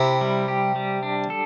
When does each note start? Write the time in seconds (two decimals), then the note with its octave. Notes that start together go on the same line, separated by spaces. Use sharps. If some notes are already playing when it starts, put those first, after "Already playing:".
Already playing: C3 E4 G4
0.21 G3
0.48 G4
0.76 G3
1.03 D4
1.30 A4